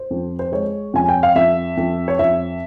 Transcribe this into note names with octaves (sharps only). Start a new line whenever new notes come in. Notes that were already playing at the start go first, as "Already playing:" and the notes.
Already playing: C5
F2
C5
G#3 C#5
F2 G#5
G5
F5
F2 E5
F2
C#5
F2 E5